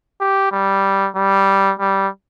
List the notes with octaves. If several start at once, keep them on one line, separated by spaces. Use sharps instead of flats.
G4
G3
G3
G3